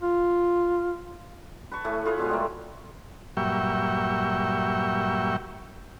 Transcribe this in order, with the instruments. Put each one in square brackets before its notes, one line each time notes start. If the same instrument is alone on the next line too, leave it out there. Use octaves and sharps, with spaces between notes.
[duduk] F4
[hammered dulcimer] B4 A5 C#6
A2 A3 G#5
F4 G#4 B4 C#5
B2 F3 G#3 B3
G3 A3 A#3
[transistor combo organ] G2 A#2 F#3 E5 G5 C#6